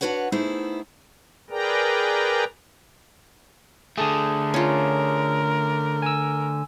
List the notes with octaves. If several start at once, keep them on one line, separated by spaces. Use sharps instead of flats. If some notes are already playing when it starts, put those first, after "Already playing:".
D4 F#4 B4 C#5 F#5
A3 B3 D#4 E4 G#4 C5
G#4 A#4 B4 D5 G5 A#5
D3 A3 G#4 A5 D#6
C#4 F4 A#4
G#5 E6